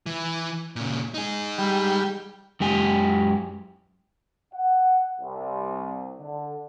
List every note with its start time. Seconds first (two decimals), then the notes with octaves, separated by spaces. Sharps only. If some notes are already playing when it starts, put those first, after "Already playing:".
0.06 E3
0.76 A#2 C#3
1.14 D#4 G#4
1.58 G3
2.60 F#2 G#3 G4 G#5
4.54 F#5
5.20 C2
6.19 D3